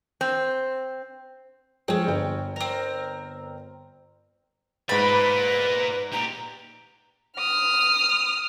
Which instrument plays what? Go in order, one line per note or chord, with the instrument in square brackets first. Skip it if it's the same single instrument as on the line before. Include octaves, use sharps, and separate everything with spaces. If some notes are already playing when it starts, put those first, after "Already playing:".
[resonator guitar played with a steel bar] C4
[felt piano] F3 G#3 G#4 [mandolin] C4 C#4
[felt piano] G1 G5
[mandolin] C4 A#4
[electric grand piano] G#2 A6 [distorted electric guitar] A#4 D5 [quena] B4 [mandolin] B5
[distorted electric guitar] A#2 G4 [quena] A#5
[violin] D#6 F6